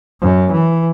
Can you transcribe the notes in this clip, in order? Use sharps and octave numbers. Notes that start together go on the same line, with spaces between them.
F#2
E3